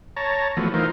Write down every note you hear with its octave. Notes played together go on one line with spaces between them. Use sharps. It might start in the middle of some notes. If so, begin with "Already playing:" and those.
C#5 A5 A#5
E3 F3 A3 B3 F#4
E3 D#4 F4 A#4 C5